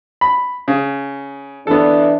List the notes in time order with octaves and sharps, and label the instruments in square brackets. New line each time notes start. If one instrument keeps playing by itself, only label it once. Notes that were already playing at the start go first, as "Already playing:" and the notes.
[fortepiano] B5
C#3
[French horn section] E3 D4 [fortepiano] B3 A4